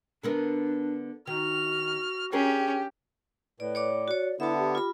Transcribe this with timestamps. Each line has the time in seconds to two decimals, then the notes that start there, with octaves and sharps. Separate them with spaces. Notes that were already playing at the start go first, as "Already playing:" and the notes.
0.23 D3 B3 D4 A#4
1.27 D#3 F#4 F6
2.33 C#4 D4 G4 G#4 A#4
3.60 A2 B4 D5
3.75 C#5 D5 D6
4.08 F#4 C#5 D5
4.40 D3 B3 E4 E5 A5
4.58 G4
4.75 F4 B5